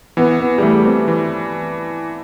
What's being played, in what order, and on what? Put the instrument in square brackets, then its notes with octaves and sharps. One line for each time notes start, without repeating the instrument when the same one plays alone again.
[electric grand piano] E3 [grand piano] B3
[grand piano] B3
G3
[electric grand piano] E3 [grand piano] A3
[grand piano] C4
[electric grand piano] E3